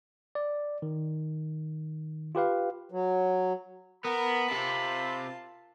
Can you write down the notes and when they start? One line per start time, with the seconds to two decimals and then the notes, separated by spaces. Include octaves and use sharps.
0.35 D5
0.82 D#3
2.35 F4 G4 B4 F5
2.92 F#3
4.05 B3 A#4 B5
4.51 C3 F4 A5